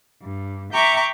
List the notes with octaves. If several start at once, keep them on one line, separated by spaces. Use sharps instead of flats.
G2
E5 G5 A#5 C#6 D6